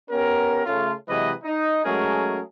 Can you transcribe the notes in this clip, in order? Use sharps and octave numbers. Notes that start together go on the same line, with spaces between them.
B3 C#4 G4 A#4
C#3 A3 F4
C3 E3 F#3 G#3 B4 D#5
D#4
F#3 G#3 A3 C#4 G#4 A#4